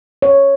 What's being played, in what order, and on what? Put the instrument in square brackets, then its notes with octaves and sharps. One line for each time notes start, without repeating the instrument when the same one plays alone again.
[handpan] C#5